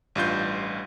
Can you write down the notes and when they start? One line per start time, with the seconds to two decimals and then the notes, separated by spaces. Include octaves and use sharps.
0.15 A1 G2 F4 G6